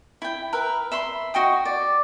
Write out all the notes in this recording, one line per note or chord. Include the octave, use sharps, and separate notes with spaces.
E4 G5
A#4 B4 E5
E5 B5 C6
F#4 D#5 G5 D#6
D5